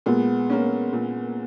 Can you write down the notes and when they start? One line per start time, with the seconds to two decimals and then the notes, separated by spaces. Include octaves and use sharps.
0.06 A#2 G#3 B3
0.50 A#3 C#4
0.93 A#2